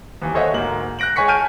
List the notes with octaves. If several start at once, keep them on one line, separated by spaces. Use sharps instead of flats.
D#2 E3
A4 C5 C#5 D#5 E5 F#5
D2 G#2 A#3 F#7
F#6 G6 A#6 D7 F#7
G#3 C#5 G#5 C#6 B6 C#7
G#5 A5 F6 G6 D7 D#7